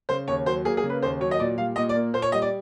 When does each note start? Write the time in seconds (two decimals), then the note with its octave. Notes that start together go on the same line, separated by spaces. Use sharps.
0.09 C#3 C5
0.28 D#2 C#5
0.46 F#3 C5
0.65 A#3 G#4
0.77 G#4
0.83 C#3
0.90 B4
1.02 D#2 C5
1.20 F#3 C#5
1.31 D#5
1.39 A#2 D5
1.58 G3 F5
1.76 A#2 D#5
1.89 D5
1.94 A#3
2.13 A#2 C5
2.22 C#5
2.32 G3 D#5
2.42 D5